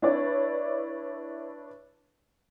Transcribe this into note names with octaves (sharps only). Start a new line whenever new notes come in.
D4 E4 B4 C#5 D5